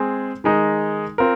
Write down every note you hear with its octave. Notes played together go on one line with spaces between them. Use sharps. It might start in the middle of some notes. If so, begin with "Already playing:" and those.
Already playing: G#3 C4 G#4
D#3 G#3 D#4
C4 F4 A#4